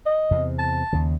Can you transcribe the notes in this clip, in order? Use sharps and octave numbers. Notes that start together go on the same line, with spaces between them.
D#5
E2 C3
A5
D#2 C#3